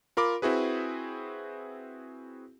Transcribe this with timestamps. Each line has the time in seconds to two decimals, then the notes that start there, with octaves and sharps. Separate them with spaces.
0.17 F4 A#4 B5 D6
0.42 C4 E4 F#4 G#4 B4